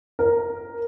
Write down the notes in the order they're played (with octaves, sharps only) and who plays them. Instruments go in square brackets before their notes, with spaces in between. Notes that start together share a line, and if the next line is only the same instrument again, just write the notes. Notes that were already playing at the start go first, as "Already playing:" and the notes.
[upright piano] A#4